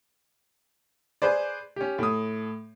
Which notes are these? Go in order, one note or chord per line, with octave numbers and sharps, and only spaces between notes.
G#4 B4 C5 D5
C#4 G4
A2 D#6